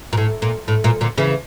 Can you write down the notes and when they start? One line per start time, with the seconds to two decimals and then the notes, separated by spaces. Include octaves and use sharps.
0.13 A#2
0.17 A2
0.42 A#2
0.68 A2
0.84 A#2
1.01 A#2 D3
1.18 C#3 E3